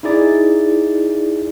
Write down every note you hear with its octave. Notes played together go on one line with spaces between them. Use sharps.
D#4 E4 G#4 D5